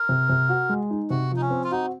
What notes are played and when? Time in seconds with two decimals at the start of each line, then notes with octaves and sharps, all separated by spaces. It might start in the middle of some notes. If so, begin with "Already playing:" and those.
Already playing: A#4
0.09 C3
0.29 C3
0.49 F#4
0.69 G#3
0.91 D#4
1.10 C3 F#4
1.31 F3
1.36 D#4
1.41 C#4
1.50 C4
1.64 F4
1.71 D#4 F#4